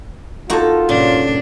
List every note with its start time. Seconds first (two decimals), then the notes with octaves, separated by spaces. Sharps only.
0.50 A#3 D#4 F4 F#4 A4
0.89 G2 A#2 C#3 D4